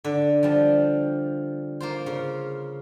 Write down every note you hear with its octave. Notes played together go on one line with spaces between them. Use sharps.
D3
F3 G3
A#3 F4 C5
C#3